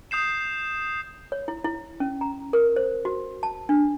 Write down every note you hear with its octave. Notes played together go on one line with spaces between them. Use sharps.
D#6 G6 C7 E7
C#5
E4
E4
C#4
A#5
A#4
C5
F#4
A5
D4